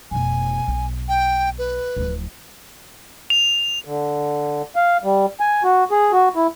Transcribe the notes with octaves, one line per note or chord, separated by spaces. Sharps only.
F1 B2 G#5
B1
G5
B4
D1 F3
F7
D3
F5
G3
G#5
F#4
G#4
F#4
E4